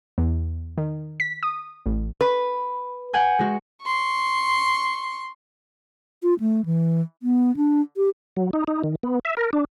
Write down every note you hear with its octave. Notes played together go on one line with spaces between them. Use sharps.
E2
D#3
B6
D#6
A1
B4
F#5 G#5 G6
G#3 F#4
C6 C#6
F4
A3
E3
B3
D4
G4
F#3
D#4
D#4
D#3
B3
E5
A#4
D4